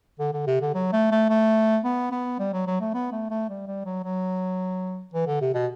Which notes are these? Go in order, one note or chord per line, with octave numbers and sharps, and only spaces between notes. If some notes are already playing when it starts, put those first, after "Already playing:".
D3
D3
C3
D3
F#3
A3
A3
A3
B3
B3
G3
F#3
F#3
A3
B3
A3
A3
G3
G3
F#3
F#3
E3
D3
C3
B2